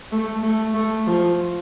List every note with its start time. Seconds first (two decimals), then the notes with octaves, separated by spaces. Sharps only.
0.12 A3
0.42 A3
0.74 A3
1.06 F3